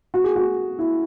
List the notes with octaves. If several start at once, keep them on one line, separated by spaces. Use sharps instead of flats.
F#4
G#4
F#4
E4